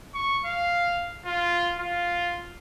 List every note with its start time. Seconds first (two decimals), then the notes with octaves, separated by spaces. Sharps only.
0.14 C#6
0.46 F5
1.26 F4
1.80 F4